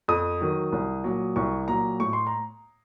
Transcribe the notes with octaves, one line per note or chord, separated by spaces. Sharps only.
F2 D#6
D#3 F#3
C2
A#2 F#3
C2 C#6
A#2 F#3 A#5
A2 C#6
C6
A#5